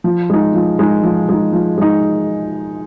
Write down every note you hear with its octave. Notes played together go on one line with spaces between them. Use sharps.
F3
G#3 D#4
F3
G#3 D#4
F3
G#3 D#4
F3
G#3 D#4